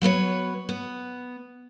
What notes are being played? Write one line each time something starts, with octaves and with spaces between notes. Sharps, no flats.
F#3 B3 B4 C#5
B3